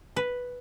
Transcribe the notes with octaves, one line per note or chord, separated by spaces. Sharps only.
B4